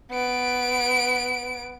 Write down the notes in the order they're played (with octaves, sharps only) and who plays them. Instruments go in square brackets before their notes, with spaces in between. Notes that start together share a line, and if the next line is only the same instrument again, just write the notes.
[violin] B3 D7